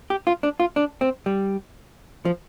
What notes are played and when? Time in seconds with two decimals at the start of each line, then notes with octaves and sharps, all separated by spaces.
0.10 G4
0.27 F4
0.43 D4
0.60 F4
0.76 D4
1.01 C4
1.26 G3
2.25 F3